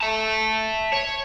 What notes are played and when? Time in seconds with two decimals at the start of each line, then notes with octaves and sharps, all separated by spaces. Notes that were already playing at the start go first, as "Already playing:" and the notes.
0.01 E5 A5
0.93 C#5